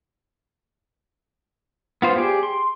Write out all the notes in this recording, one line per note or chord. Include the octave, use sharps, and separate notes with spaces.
B3 F4 C5
G4 G#4 D5
C6